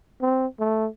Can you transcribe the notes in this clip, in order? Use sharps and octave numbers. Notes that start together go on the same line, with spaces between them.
C4
A3